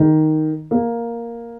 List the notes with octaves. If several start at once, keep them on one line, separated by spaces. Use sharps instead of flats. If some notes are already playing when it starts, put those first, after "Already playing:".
Already playing: D#3
A#3